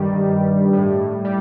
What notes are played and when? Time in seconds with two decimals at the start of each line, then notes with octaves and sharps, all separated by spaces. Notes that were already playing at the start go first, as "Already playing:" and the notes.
Already playing: G2 D#3 G3
0.73 A2
1.25 G3